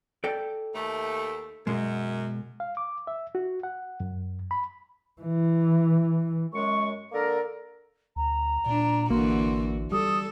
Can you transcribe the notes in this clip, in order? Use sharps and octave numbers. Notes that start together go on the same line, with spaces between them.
A4 D5 G5
D#2 A3
F#2 B2 G#3
F5
D6
E5
F#4
F#5
F#2
B5
E3
F#2 G#3 C#6
D3 A#3 A4 A#4
D2 A#5
A#2 D4
A1 D3 E3 A#3 F#4 C6
G3 A4 D#6